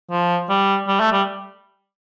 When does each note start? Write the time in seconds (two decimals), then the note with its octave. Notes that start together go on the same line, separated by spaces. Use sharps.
0.11 F3
0.49 G3
0.88 G3
1.00 A3
1.12 G3